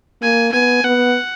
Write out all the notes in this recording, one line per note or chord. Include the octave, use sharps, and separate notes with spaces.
A#3 G#5
B3 G#5
B3 F#5